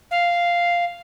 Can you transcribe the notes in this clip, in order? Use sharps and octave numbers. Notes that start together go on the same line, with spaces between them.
F5